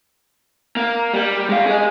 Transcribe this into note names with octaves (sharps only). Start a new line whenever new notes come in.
A#3
G3
G#3 F5
G#4 D#5